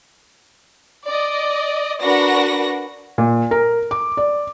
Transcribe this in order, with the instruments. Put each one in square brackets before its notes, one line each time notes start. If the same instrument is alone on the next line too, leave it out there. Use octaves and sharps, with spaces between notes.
[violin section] D5 D#5
D4 F#4 A#4 B4 F#5 A#6
[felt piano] A#2
A#4
D6
D5